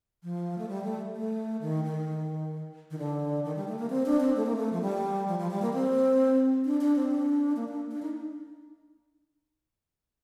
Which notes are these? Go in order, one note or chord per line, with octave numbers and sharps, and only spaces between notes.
F3
A3
G3
A3
A3
D#3
D#3
D#3
D3
D#3
G3
A3
A#3
C4
D4
C4
A3
A#3
A3
F3
G3
F3
F3
G3
A#3
C4
D4
D4
C4
D4
A#3
D4
D4
D#4